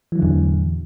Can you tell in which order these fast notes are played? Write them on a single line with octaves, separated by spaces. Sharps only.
E3 F#3 D3 E2 A2